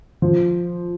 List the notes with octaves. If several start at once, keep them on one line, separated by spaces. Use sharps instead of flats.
F3